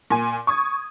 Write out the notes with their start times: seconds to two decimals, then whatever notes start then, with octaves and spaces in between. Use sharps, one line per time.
0.10 A#2 G#5
0.47 C#6 D#6 G#6